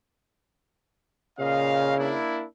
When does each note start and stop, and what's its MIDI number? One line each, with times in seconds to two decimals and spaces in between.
1.39 1.95 46
1.39 2.17 49
1.39 1.95 75
1.39 1.95 77
1.97 2.44 58
1.97 2.44 62
1.97 2.44 64